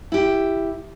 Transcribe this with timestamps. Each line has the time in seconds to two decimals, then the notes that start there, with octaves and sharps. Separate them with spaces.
0.12 E4 G4